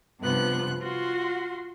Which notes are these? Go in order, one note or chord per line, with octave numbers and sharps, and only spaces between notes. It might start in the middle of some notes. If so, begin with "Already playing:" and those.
G2 C3 F3 B3 F#6
F4 F#4 C6